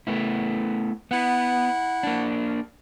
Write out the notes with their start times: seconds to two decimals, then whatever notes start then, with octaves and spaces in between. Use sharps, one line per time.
0.07 A3 B3 E4
1.11 B3 E4 F#5
2.03 A#3 D4